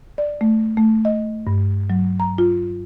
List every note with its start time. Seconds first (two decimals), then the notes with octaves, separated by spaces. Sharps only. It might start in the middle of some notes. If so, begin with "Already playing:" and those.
0.18 D5
0.41 A3
0.77 A3
1.05 D#5
1.47 G2
1.90 F#3
2.20 A#5
2.38 F4